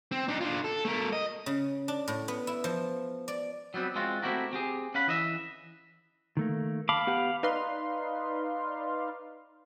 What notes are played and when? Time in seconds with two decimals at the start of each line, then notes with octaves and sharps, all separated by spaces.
0.12 C4
0.28 D4 D#4
0.41 D4 F4
0.64 A4
0.85 A3 A#4
1.12 D#5
1.46 C#3
1.88 D4
2.08 A2
2.28 B3
2.47 E4
2.64 F3
3.28 D5
3.74 F#3 G3 B3 C4
3.95 G#3 C4 F4 F#4
4.23 A3 C4 E4 F#4 G4 A#4
4.53 C4 G4 G#4
4.95 C#4 F5 F#5 B5
5.07 E3 D#5 E5
6.37 D#3 A3 A#3
6.89 F5 A5 B5 D6
7.07 B3 G4 F#5
7.43 D#4 B4 D5 F5 C6